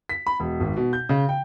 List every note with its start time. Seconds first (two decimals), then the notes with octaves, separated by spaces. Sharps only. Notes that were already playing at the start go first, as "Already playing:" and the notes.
0.09 B6
0.27 B5
0.40 E1
0.60 G#1
0.77 B2
0.93 G6
1.09 C#3
1.29 G5